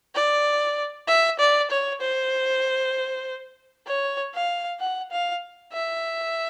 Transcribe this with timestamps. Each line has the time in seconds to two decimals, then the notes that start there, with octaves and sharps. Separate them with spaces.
0.15 D5
1.08 E5
1.39 D5
1.71 C#5
2.01 C5
3.87 C#5
4.34 F5
4.80 F#5
5.11 F5
5.73 E5